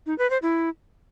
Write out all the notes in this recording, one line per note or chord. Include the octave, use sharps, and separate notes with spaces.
D#4
B4
C5
E4